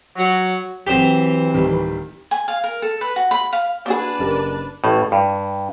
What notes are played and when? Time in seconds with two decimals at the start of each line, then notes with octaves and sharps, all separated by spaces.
0.17 F#3
0.87 E3 F#3 C4 G4 D6 B6
1.54 D1 D#3 G3
2.31 G#5
2.48 F5
2.64 A#4
2.82 A4
3.01 B4
3.16 F#4
3.31 B5
3.53 F5
3.86 A#3 D4 F#4 G#4 B4
4.19 F#1 G4 A#4
4.84 A1 A2
5.12 G2